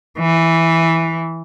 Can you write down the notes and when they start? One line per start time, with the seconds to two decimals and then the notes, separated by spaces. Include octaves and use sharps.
0.19 E3